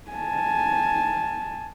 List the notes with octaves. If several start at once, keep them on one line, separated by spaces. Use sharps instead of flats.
G#5 A5